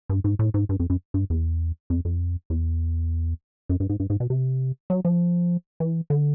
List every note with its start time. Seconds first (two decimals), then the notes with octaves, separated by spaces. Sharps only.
0.09 G2
0.24 G#2
0.39 A2
0.54 G#2
0.69 G2
0.79 F2
0.90 F#2
1.14 G2
1.30 E2
1.90 F2
2.05 F2
2.50 E2
3.69 F#2
3.80 G2
3.89 G#2
4.00 G2
4.10 G#2
4.20 B2
4.30 C3
4.90 F#3
5.05 F3
5.80 E3
6.10 D3